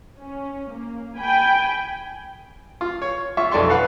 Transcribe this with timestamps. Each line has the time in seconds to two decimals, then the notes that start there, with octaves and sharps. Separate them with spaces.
0.18 C#4
0.71 A#3
1.17 G5 G#5 B5
2.81 F4
3.02 C#5
3.37 F4 E5 C#6
3.51 B1 F2 A4 D5 C6 C#6
3.70 B4 F5 F#5